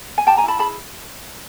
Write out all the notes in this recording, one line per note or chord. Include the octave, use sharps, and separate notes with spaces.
G#5
G4 G5 A5
G#5 A#5
E4 A5 B5
G#4 A5 B5